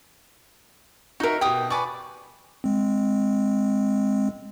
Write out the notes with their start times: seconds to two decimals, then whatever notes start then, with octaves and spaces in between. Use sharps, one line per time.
1.20 D#4 F#4 A#4 E5
1.41 B2 G4 G5 D#6
1.70 B4 D5 G#5 C#6 D6
2.64 G#3 C4